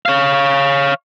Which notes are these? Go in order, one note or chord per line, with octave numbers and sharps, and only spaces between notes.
C#5 F5